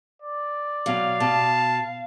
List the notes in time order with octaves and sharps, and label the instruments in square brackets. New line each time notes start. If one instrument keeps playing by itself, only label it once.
[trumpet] D5
[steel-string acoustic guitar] B2 F#3 [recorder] F5
[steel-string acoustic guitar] B2 [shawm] A5